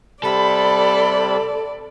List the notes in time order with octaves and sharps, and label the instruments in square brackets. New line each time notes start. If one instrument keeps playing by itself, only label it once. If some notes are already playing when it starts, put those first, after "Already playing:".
[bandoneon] C3 G3 [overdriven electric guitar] A4 [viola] D5 [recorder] B5